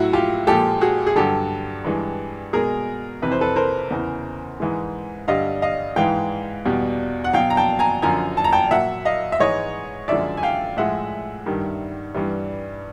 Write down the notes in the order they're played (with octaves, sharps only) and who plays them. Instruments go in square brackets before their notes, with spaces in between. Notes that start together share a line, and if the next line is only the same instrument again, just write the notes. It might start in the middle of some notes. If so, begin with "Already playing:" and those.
Already playing: [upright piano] A2 F#3 E4 F#4
F4 G4
A#2 F3 G#3 G4 A4
F#4 G#4
G#4
G2 D3 F#3 G4 A4
G2 E3 G#3
B2 G#3 G#4 A#4
F2 C3 E3 B4
C5
A4 B4
A#4 C5
E2 C#3 E3
G#2 E3 G#3
G2 D3 G3 D#5 F5
D#5 F5
G#2 E3 G#3 F5 G5
E2 B2 G3
F#5
B2 F#3 F5 G5
A#5
G5 A5
G#5 A#5
F#2 D3 F3 G#5 A#5
A5
A#5
G5 A5
A#2 F#3 E5 F#5
D#5 F5
E5
G#2 E3 G#3 C#5 D#5
F#2 D3 F3 G#3 D5 E5
G#5
F5 G5
A2 F3 G#3 E5 F#5
G2 D#3 G3
G2 E3 G3